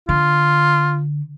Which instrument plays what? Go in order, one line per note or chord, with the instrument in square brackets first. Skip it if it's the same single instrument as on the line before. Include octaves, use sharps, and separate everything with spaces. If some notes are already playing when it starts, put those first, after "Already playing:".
[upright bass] D3 [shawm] F4